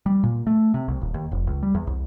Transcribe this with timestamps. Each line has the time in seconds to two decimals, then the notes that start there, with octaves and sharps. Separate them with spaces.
0.06 G3
0.23 A#2
0.47 A3
0.74 C3
0.88 C2
1.01 D#1
1.14 D#2
1.31 F1
1.47 C#2
1.63 G3
1.74 E2
1.87 C2